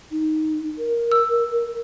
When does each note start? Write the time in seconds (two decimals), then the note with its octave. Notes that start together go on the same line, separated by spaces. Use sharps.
0.11 D#4
0.78 A#4
1.12 E6